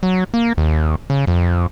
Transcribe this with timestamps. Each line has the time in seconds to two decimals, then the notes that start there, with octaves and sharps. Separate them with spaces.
0.03 F#3
0.34 A#3
0.58 D#2
1.10 C#3
1.27 F2